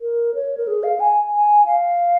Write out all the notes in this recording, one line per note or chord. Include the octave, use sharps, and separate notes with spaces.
A#4
C#5
A#4
G#4
F5
G#5
G#5
F5